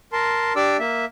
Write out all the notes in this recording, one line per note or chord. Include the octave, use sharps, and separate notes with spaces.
A#4 A5 C6
D4 G4 D5 D6 E6
A#3 E5